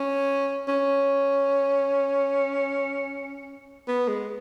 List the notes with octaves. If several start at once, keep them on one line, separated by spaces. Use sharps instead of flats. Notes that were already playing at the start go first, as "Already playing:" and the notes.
Already playing: C#4
C#4
B3
G#3